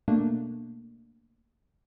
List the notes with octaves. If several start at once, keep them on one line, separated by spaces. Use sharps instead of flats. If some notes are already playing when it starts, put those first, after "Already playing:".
B2 A3 A#3 D4